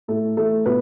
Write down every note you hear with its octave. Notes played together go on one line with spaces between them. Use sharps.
A2 A3 A4
E3 A3 A4
B2 B3 B4